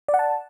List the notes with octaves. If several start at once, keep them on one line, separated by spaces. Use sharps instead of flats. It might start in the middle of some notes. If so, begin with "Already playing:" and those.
D5
F#5
A5